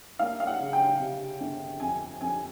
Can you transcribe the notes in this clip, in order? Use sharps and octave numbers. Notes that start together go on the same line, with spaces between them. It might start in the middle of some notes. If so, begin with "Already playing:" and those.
A#3 F5
F5
F#5
C#3
G5
C3
G1
F2 G#5
F2 G#5